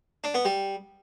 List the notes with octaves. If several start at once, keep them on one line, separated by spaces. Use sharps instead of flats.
D4
B3
G3